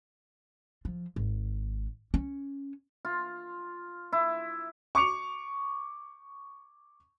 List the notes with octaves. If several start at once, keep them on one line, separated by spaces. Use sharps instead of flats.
F3
G#1
C#4
F4
E4
C#6 D6 C#7 F7